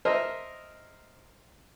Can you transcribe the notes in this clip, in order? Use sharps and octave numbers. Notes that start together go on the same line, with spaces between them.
A#4 C5 D#5 E5